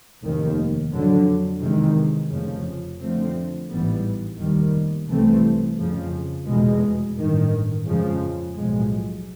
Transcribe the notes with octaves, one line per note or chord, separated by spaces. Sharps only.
F1 D#2 D#3
F2 D3 F#3
E2 C3 D#3 G#3
F1 F2 C#3 F3
F2 D3 F3 A3 C4
A1 G#2 E3 G3 B3
F1 D#2 D#3 G3
C2 C3 E3 A3 C4
F2 C#3 F3
F1 E2 B2 G#3
A1 G2 D#3
F2 C#3 F3 G#3
B1 A2 F3 G#3